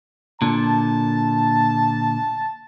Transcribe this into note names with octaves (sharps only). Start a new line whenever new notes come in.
A#2 D3 A5